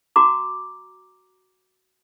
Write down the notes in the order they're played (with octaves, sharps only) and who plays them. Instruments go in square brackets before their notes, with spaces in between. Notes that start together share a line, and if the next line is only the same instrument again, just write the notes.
[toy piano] F#4 A#5 D6